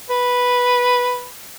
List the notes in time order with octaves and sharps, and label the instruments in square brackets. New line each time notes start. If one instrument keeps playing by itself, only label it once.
[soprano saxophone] B4